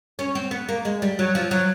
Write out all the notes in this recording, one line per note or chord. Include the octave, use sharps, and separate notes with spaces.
C#4
C4
B3
A#3
G#3
G3
F#3
F3
F#3